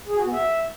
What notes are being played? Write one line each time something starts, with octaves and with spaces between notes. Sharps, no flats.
G#4
F#4
B3
E5